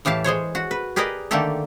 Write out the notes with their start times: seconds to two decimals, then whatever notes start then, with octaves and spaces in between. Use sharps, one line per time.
0.05 A2 E3 G4 F5 A5
0.24 G#3 G#4 C5 C#5
0.55 F#4
0.71 B4
0.96 G4 G#4 A#4 B4 D5 D#5
1.31 D3 D#3 A3 A#3 G4 A4